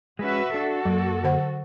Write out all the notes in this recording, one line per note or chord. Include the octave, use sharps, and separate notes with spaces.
G#3 C#4 F#4 B4 E5
D4 F#4 A4
F#2 F#3 A#3
D3 C5 F#5